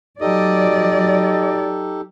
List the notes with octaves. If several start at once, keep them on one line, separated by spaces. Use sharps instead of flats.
F#3 D#4 G4 A4 D5 D#5